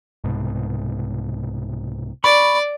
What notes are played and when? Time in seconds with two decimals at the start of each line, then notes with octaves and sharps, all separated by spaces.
0.24 C2 G#2 B2
2.24 D5 B5 C#6